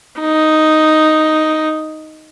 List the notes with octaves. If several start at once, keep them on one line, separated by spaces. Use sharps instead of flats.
D#4